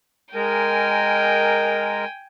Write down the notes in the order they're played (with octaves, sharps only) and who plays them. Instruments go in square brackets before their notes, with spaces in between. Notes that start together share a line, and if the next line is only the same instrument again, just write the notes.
[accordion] G#3 A#4 [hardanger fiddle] G5 G#5